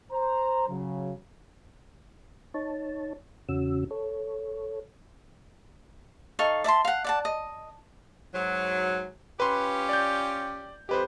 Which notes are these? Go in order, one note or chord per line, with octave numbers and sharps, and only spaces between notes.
C5 A#5
C#3 F#3
D#4 C#5 A5
E2 C#3 C#4 F#4 E6
A4 C#5
D#4 A4 F5 C#6
D5 E5 A5 C6
F5 F#5
D5 F#5 A5
D#5
G#2 F#3
C#4 F4 G4 B4 C6
D5 G6
F2 G#3 G4 B4 C5